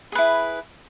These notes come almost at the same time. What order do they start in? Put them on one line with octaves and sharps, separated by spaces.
G#4 B4 E4